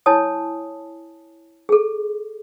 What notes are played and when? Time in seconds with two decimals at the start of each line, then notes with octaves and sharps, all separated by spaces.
0.06 E4 C#5 G#5 A5 D#6
1.69 G#4 A4